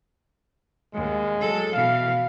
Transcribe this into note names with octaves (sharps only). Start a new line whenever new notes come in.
D#2 G#3
F#3 A4
B2 E3 F5